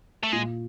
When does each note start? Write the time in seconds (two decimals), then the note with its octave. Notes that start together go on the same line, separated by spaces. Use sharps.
0.23 A3
0.32 A#2 G#3